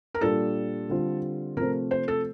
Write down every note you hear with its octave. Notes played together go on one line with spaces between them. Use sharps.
A#4
A#2 G3 D4 F4 A4
D3 G3 C4 F4
C3 F3 A3 C4 A#4
C5
A4